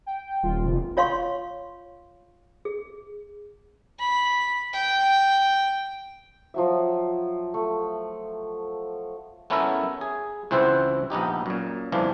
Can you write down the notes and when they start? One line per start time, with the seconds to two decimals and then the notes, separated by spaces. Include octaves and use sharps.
0.06 G5
0.43 D#1 F4
0.65 F1
0.97 F4 C#5 F5 C6 C#6
2.65 G#4
3.99 B5
4.73 G5
6.54 F3 F#3 E5
7.54 A3
9.50 A3 B3 C#4 E4 A#4 E5
10.01 G#4
10.51 C#2 E3 C4 C5 E5 F#5
11.10 A#1 B3 D#4 G4
11.46 F#2 A#2
11.92 G1 F2 E3 F3 D4 F5